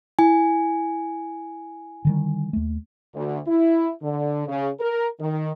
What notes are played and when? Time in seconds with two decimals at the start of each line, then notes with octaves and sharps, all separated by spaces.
0.19 E4 G#5
2.05 D3 D#3 G3
2.53 D#2 A3
3.14 D2
3.47 E4
4.02 D3
4.47 C#3
4.79 A#4
5.20 D#3